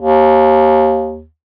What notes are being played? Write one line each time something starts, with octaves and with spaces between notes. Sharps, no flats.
D#2